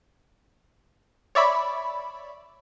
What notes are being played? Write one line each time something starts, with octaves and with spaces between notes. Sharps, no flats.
C#5 D5 E5 B5